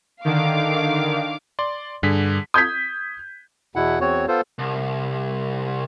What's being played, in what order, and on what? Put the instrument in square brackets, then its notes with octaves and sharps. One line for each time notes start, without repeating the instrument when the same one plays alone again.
[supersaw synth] D3 D#3 [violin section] F5 D6
[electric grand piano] D5 C6
[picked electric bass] G2 [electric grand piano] D3 G#4 B6
[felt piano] D#6 G6 G#6 B6
[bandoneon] E2 B2 E4 F#5
E2 C4 F#4 C#5
B3 F4 A4 C5
[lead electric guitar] C2